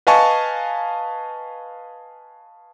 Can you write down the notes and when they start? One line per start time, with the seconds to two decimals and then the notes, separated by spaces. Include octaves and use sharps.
0.07 B4 D#5 F5 G#5 A5 C#6